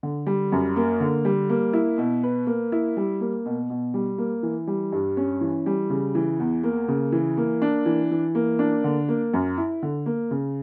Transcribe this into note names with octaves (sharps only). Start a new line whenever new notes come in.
D3
G3
F#2
A#3
D3
G3
A#3
E4
B2
B4
A#3
E4
G3
A#3
B2
B2
G3
A#3
E3
G3
G2
C#4
E3
G3
C#3
E3
E2
A#3
C#3
E3
A#3
D4
E3
E3
A#3
D4
D3
A#3
F#2
E4
D3
A#3
C#3